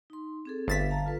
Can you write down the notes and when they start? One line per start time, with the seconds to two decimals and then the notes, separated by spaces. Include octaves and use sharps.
0.10 D#4 C6
0.45 C4 G#4 A4
0.68 G1 B4 E5 F5 A6 B6
0.91 F5 A5 A#5
1.06 F4 A4 B4